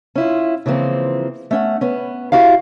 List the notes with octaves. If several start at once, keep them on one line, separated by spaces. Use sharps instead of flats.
C#4 E4 F4
C#3 E3 F3 A#3 C4
A3 C#4 F#5
B3 C#4
E4 F#4 G4 F5